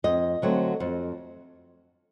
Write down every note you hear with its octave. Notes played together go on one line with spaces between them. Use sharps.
F2 D#5
D3 F#3 A3 C4
F2